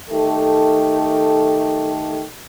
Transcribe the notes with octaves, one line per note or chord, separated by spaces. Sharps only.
D#3 A3 G4 A4